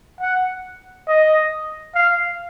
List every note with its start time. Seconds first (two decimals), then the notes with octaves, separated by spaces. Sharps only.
0.21 F#5
1.07 D#5
1.95 F5